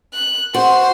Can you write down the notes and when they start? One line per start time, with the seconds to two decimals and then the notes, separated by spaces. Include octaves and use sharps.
0.14 F#6
0.54 F#4 C5 C6